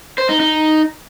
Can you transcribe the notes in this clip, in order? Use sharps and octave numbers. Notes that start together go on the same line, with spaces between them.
C5
D#4
D#4